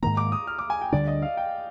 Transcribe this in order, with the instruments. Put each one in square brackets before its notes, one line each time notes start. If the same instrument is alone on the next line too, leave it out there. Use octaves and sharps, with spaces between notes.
[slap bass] G#2 D#3 A#3 [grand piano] A#5
[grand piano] D6
D#6
F6
D6
G#5
G5
[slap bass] D2 D3 G3 D4 [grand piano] D5
[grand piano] D#5
F5
G5